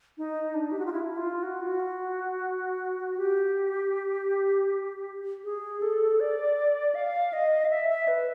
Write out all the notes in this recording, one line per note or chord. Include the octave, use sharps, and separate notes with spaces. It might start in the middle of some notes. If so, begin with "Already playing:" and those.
D#4
D4
G4
F#4
F4
E4
E4
F4
F#4
F4
F#4
G4
G#4
A4
D5
F5
D#5
F5
E5
E5
B4